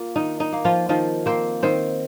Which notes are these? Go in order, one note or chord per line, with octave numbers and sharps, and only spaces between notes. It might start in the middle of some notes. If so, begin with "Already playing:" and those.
Already playing: A#3 F4
D#3 D#4
D#4
A#3
F3 F4
D#3 F3 F4
A#3 C4 C5
D#3 C4 C5